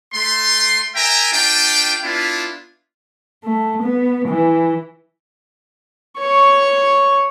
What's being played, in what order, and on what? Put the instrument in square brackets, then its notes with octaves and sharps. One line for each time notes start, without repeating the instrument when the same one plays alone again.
[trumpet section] A3 C6
A#4 E5 G5 G#5 A#5
A3 D4 F4 G5
B3 D4 E4 F4
[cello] A3
B3
E3
[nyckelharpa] C#5 C#6